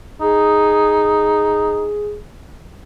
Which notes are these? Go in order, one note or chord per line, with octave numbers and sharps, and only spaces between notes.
D#4 G#4